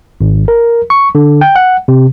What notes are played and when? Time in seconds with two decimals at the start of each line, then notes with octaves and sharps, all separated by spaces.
0.21 G#1
0.48 A#4
0.90 C#6
1.15 D3
1.41 G5
1.56 F#5
1.88 C3